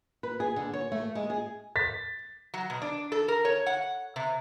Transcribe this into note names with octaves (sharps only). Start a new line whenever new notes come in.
B4
G#4
D3
C#5
A3
G#3
G#4
A6 B6
F#3
B2
D4
A4
A#4
C#5
F#5
C3